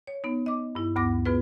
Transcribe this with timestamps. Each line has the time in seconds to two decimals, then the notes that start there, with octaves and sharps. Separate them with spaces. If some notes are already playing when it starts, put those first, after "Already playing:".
0.07 C#5
0.24 B3 D#4
0.46 D#5 D6
0.75 G2 E4
0.96 D2 G2 B3 D6 A#6
1.26 B3 F4 G#4 B4